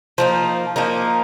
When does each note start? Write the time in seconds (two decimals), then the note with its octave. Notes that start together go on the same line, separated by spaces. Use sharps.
0.18 F3 A#3 D#4
0.76 F3 A#3 D#4